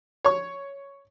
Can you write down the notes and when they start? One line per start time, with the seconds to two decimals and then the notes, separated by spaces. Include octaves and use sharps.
0.25 C#5 C#6